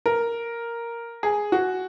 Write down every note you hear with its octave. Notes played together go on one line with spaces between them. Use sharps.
A#4
G#4
F#4